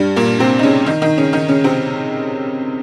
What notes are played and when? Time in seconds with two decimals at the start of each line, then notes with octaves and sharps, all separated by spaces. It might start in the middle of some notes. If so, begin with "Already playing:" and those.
Already playing: G2 G3
0.16 A#2 A#3
0.39 C3 C4
0.59 D#4
0.63 C#3 C#4
0.86 D#3 D#4
1.02 D#3 D#4
1.18 C#3 C#4
1.33 D#3 D#4
1.48 C#3 C#4
1.64 C3 C4